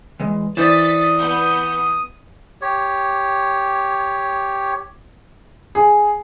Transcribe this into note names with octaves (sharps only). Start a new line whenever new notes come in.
E3 G#3
E3 C5 D5 D#6 A6 B6
B3 G6
G4 C#5
G#4